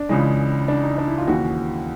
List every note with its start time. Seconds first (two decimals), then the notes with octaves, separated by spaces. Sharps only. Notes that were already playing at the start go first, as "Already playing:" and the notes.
Already playing: D4
0.09 C#2 C#3 E3 G#3
0.68 D4
0.83 D#4
0.98 D4
1.08 E4
1.18 F4
1.27 D#2 C#3 E3 F#4